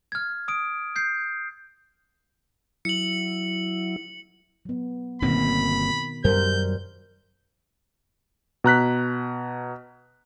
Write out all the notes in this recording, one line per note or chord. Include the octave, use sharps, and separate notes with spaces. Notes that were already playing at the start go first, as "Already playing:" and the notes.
F6 G#6
D#6 D7
G6 C7
F#3 E4 C#7 F#7
F#3 B3
G1 B2 D#3 A#3 C4 B5
F#2 G3 A#4 C5 G6
B2 A#5 F#6 B6